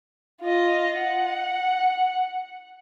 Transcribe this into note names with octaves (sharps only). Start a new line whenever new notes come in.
F4 D#5
F#5